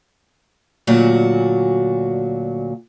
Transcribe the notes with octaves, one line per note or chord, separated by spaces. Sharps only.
D2 A#2 F#3 F#4